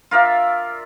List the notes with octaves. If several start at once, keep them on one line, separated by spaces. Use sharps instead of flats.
F4 A#4 D5 E5